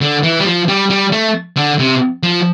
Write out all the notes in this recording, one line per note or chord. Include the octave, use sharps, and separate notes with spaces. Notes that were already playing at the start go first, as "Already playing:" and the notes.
D3
E3
G3
F3
G3
G3
A3
D3
C3
F3